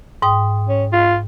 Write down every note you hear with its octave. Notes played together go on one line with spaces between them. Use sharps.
G#2 G5 D#6
C#4
F4